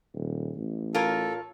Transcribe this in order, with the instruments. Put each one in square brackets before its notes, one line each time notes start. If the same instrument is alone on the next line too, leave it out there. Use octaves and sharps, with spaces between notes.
[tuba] D#1
A1
[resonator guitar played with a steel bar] F4 A#4 C#5 [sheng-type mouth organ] A4